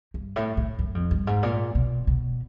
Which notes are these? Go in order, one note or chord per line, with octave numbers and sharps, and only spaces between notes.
G2
A2
A2
F#2
F2
G2
G#2
A#2
B2
B2